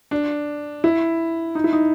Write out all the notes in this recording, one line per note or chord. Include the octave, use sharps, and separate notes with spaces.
D4
E4
D#4
E4
D#4